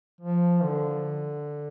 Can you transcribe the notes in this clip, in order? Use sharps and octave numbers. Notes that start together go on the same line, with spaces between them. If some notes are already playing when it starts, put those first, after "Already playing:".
F3
D3